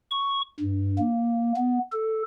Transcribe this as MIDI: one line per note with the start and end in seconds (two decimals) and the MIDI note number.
0.11 0.42 85
0.60 0.99 43
0.99 1.53 58
1.56 1.79 59
1.92 2.22 69